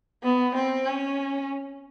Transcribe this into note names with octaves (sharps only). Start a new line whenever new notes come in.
B3
C4
C#4